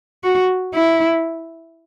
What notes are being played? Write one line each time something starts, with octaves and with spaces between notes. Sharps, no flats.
F#4
E4